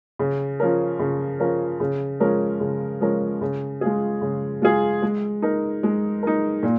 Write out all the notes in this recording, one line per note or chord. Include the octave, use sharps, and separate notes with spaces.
C#3
F3 C#4 A#4
C#3
F3 C#4 A#4
C#3
F3 G#3 C#4 A#4
C#3
F3 G#3 C#4 A#4
C#3
G#3 F4 G#4
C#3
G#3 F4 G#4
G#3
D#4 A#4
G#3
D#4 A#4
A#2